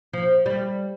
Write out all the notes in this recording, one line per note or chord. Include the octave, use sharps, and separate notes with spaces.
F3
G3